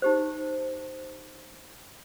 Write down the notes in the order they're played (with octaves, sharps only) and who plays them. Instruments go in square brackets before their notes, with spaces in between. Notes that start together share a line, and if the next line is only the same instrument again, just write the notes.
[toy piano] D#4 G4 C5